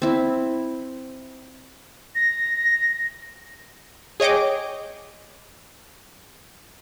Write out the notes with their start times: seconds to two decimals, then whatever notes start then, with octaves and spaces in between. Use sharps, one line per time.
0.02 C4 E4
2.15 A#6
4.20 G#4 C#5 D#5 G5 D6